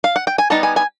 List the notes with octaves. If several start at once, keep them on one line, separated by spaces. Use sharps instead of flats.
F5
F#5
G5
G#5
G3 B3 D#4 A5
G#5
G#5